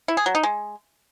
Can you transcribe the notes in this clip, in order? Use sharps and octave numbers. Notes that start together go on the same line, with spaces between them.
E4
G#4
F#3
D#4
G#3